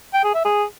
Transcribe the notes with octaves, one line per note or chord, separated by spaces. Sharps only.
G5
G#4
E5
G#4